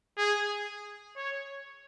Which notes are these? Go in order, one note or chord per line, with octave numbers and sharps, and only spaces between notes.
G#4
C#5